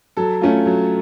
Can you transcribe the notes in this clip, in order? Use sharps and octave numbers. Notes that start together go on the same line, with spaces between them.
F#3 A4
A3 C#4 F4
F#3